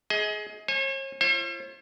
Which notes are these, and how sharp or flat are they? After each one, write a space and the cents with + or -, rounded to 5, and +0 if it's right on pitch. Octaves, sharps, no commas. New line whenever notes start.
G#4 +20 D#5 +35
C#5 -45 G#5 +10
F4 -45 C5 +45